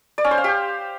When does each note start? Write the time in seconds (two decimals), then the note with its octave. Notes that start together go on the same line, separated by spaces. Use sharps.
0.18 D5
0.24 C#4
0.31 C5
0.38 F5
0.44 G4